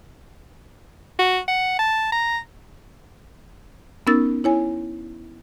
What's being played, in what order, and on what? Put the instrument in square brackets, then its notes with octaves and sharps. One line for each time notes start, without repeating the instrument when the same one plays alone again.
[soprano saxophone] F#4
F#5
A5
A#5
[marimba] B3 C#4 D#4 A#4 E6 A6
E4 C#5 G#5